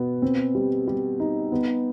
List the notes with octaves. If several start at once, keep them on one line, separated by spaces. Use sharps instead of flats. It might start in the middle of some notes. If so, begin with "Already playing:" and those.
Already playing: B2 B3
C4
G3
G3
D#4
B3